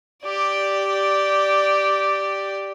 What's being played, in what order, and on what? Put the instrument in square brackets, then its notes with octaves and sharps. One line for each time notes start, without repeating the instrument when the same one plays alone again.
[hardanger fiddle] G4 D5